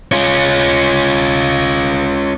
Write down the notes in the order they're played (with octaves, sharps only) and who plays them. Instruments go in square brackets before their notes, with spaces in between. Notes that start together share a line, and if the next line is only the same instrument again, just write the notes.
[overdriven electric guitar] C#4 F4